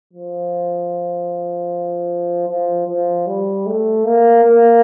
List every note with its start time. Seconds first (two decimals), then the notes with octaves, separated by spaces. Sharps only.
0.13 F3
2.48 F3
2.87 F3
3.27 G3
3.66 A3
4.05 A#3
4.44 A#3